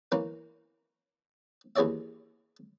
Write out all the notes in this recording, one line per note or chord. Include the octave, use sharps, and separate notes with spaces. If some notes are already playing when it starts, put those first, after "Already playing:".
E3 A#3 C#4
D#2 E3 G#4 C#5 D5 E5